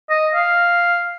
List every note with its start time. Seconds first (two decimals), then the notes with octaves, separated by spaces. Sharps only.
0.10 D#5
0.35 F5